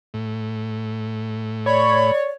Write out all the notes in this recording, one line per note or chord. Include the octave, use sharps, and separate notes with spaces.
A2
C#5 D5 B5